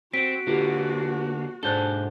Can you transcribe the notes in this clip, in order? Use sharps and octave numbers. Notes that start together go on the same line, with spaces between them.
C4 F#4 B6 D7
D3 A#3 F4 G4 B4
G#2 D4 A4 C5 F#6 G6 G7